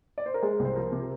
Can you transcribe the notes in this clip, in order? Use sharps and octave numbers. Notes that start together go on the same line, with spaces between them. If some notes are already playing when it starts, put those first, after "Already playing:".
D5
C5
A#4
G#3 G#4
C2
C5
F3 A#4
C3